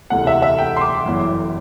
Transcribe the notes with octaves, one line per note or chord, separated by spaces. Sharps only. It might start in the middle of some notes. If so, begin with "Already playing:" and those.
E1 D2 C3 E3 F#5
E5
E5
G5
C6
D6
G1 F#2 E3